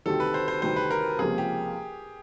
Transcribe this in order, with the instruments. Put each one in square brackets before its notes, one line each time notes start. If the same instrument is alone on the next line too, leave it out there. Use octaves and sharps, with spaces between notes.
[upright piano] D2 C3 D#3 G3 C4 [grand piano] A4
[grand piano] B4
C5
C5
[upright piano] D2 C3 D#3 G3 C4 [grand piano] C5
[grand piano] B4
A#4
[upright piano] C#2 C3 F3 A#3 [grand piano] G#4
[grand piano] G4